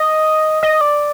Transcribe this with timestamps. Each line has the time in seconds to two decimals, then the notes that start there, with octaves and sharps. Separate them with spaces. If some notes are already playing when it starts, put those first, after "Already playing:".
Already playing: D#5
0.63 D#5
0.81 D5